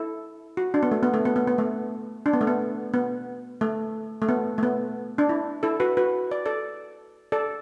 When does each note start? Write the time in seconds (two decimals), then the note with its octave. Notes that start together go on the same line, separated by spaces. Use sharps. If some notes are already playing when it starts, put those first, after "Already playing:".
Already playing: E4 A4
0.57 F#4
0.74 D4
0.83 B3
0.91 A3
1.03 B3
1.14 A3
1.25 B3
1.36 B3
1.47 B3
1.58 A3
2.26 D4
2.33 B3
2.41 A3
2.47 B3
2.94 B3
3.61 A3
4.22 A3
4.29 B3
4.58 A3
4.63 B3
5.18 D4
5.29 E4
5.63 E4 A4
5.80 F#4 B4
5.97 F#4 B4
6.31 D5
6.46 A4 D5
7.32 A4 D5